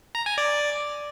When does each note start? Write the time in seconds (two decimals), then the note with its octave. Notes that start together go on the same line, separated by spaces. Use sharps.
0.15 A#5
0.26 G#5
0.38 D5